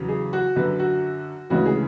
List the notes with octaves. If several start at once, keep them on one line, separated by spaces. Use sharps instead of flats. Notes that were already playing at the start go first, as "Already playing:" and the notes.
Already playing: E2 C#3 F#3
G#4
F#4
F#2 D3 F#3 B4
F#4
D2 C#3 E3 G#3 F#4
G#4